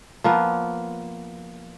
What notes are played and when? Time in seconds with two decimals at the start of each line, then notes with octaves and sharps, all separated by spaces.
0.24 F3 A#3 B3